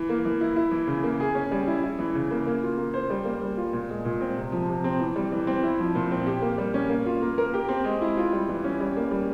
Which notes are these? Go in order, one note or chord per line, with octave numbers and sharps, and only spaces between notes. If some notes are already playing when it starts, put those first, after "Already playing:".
Already playing: E3
A#3
E3
E4
E4
E3
C#3
A#3
G#4
C#4
G3
E4
E4
E3
C#3
A#3
A#3
F4
A#3
C5
G3
A#3
G3
F4
A#2
G#3
A#2
C4
C3
F3
C3
C4
E3
G3
E3
C4
E4
F3
A#2
C4
G4
A#3
G3
C#4
A#3
F4
A#3
A#4
G4
C4
G#3
E4
F4
G3
E3
C#4
G3
A#3
G3